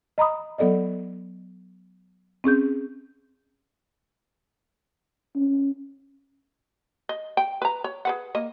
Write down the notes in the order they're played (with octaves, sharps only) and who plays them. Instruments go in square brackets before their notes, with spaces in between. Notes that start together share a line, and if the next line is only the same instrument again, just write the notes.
[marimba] D#5 A#5 B5 D#6
F#3 B3 A4 D5 D#5
C4 C#4 G#4 G6
[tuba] C#4
[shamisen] D#5
G5
B4 A#5
C#5
G#4 B4 F#5
A#3 D#5